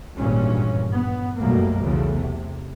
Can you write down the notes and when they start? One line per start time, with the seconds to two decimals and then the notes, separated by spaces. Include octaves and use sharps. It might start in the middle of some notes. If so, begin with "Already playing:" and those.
0.19 G#1 G2 A#2 E3 C#4
0.90 B3
1.39 B1 F#2 B2 G3 A3 A#3
1.82 B1 E2 C#3 E3 A3
2.18 C3